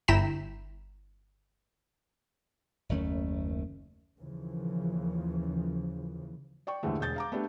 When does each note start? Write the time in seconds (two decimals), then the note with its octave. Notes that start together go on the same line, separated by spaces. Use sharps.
0.08 G1 E4 G5 A#5 B6 E7
2.89 F#1 D#2 A3 C#4
4.18 D#2 C#3 E3 F3
6.67 D5 G5 C#6
6.83 D#2 G#2 D3 E3 A3
7.00 E1 G#4 G6 A6
7.16 F5 A#5 D6
7.32 A3 B3 D4 G4